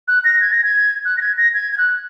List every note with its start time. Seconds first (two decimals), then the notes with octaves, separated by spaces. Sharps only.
0.08 F#6
0.25 A#6
0.41 G#6
0.52 A#6
0.64 G#6
1.05 F#6
1.17 A#6
1.21 G#6
1.37 A#6
1.54 G#6
1.73 G#6
1.78 F#6